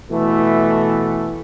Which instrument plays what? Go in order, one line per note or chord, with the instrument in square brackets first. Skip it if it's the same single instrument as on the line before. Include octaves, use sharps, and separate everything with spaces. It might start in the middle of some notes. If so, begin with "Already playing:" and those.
[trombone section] B2 E3 A3